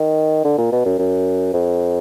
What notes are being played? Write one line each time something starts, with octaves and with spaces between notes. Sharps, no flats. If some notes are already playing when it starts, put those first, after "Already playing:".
Already playing: D#3
D3
A#2
B2
F#2
F#2
F2